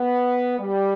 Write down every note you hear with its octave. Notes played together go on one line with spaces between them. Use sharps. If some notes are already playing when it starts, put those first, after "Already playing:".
Already playing: B3
G3